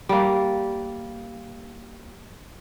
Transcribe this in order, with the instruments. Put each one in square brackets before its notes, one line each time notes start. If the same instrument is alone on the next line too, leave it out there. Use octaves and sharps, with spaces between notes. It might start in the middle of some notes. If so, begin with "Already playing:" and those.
[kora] G3 A#3